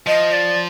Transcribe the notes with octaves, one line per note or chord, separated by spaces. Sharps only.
F3 D#5
D5